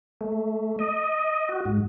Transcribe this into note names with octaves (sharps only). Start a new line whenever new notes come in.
A3
D#5
F#4
G#2